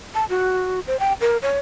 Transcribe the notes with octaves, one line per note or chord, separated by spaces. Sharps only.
A5
F#4
C5
G5
A#4
C#5